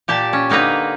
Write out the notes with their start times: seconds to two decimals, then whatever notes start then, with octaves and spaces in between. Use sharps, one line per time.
0.08 A#2 G4 D5 A5
0.33 C#4
0.50 D3 A#3 D#4 B4 A#5